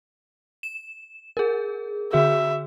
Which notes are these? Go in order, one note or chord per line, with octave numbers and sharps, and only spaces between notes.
E7
G#4 A#4
D3 F#4 G#4 E5